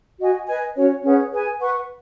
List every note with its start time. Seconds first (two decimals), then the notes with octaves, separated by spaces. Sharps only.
0.20 F#4 D#5 G#5
0.47 B4 D#5 G#5
0.76 C#4 F#4 C#5
1.04 C#4 G#4 B4 F#5
1.32 G#4 B4 G#5
1.60 B4 F#5 C#6